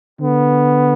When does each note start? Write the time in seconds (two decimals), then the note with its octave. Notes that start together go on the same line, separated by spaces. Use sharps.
0.20 D3 B3